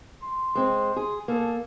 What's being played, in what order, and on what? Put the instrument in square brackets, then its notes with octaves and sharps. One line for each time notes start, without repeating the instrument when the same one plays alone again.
[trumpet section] C6
[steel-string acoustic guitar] G#3 C4
G#4
[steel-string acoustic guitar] A#3 [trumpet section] G#4 A4